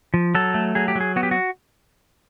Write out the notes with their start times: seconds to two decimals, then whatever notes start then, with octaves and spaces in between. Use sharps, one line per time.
0.14 F3
0.35 F#3 A4
0.54 A3
0.75 F#3 G#4
0.88 G4
0.95 F#3
1.00 G#4
1.16 B3 F#4
1.23 G4
1.31 F#4